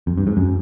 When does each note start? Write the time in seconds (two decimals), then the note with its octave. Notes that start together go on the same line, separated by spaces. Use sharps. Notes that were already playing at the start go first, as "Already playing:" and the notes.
0.07 F2
0.18 G2
0.27 G#2
0.37 F#2